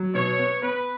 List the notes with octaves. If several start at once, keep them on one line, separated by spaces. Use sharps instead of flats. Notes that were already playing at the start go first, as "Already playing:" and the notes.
Already playing: F#3
B2 C#5
B3
B3 B4